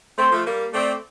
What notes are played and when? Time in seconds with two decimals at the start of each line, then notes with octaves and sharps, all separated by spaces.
0.18 A3 C4 C5
0.32 F3 A3
0.46 G3 A#3
0.74 A3 C4 D5